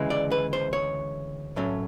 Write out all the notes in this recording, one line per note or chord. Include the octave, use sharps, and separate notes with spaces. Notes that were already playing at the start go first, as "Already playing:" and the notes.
Already playing: D2 C#3 E3 G#3
D5
B4
C5
C#5
A2 F#3 A3 C#4